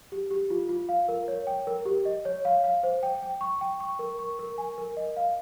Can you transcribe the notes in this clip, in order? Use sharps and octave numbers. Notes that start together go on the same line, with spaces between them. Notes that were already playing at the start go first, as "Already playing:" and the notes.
G4
G4
F4
F4
F5
A#4
C#5
G5
A#4
G4
D#5
C#5
F5
F5
C5
G5
G5
C#6
G5
C#6
A#4
C#6
A#4
G#5
A#4
D#5
F5